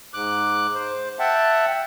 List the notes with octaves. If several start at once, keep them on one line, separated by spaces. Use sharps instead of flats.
G#2 D6 F#6
C5
E5 F#5 G5 A5